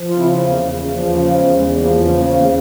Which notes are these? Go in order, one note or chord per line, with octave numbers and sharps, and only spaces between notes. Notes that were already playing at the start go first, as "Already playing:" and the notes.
Already playing: F3
F4
C#3 C4 E4
E2
A#3 C#4
E2
A#3 C#4
F3
C#3 G3 A#3
E2 G#3
E2 G#3
F3 G3 A#3
C#3 A#3 C#4
E2 A#3 C#4